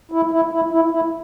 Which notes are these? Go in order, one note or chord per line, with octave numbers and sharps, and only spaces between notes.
E4
E4
E4
E4
E4